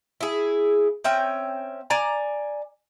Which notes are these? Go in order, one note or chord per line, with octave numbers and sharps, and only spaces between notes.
E4 G#4
C4 C#4 E5 G5
D5 G#5 A#5